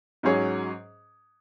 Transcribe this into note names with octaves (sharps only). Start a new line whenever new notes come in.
G#2 F#3 C#4 G#4 C#5